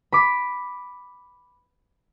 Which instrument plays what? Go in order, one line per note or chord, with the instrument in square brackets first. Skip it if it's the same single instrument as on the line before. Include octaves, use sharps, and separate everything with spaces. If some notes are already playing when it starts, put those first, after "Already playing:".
[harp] B5 D6